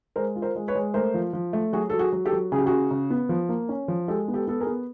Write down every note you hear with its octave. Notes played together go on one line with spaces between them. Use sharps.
G#3 A#4 C5
F4
A#4 C5
G#3
B4 C#5
G#3
A3 A#4 C5
F3
F3
A3
F#3 F#4 G#4
F#3 A4
F#4 G#4
F#3
G4 A4
F#3
C#3 G#4
G4
C#3 F#4 G#4
C#3
B3
F3
A#3
C#4
F3
G#3 G4 A4
B3
G4 A4
B3 A4
G#4 A#4
B3